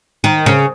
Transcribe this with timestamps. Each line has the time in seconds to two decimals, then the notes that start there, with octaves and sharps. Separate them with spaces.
0.24 D#3
0.46 C#3